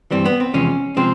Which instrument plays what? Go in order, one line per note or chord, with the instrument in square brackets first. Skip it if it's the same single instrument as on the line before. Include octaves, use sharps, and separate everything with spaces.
[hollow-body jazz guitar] G2 E3 G3 C4
B3
C4
E2 C3 F3 G#3 C#4
C3 F3 G#3 C4